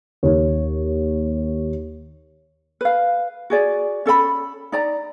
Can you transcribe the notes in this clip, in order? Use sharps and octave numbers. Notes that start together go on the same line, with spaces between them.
D#2 C#5
B4 F5
F#4 G#4 D5
C#4 A4 D5 B5
D#4 D5 A#5